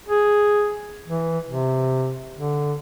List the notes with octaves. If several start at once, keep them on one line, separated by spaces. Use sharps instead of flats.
G#4
E3
C3
D3